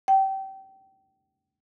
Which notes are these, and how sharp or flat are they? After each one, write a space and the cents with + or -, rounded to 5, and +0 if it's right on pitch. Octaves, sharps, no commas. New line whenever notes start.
G5 -25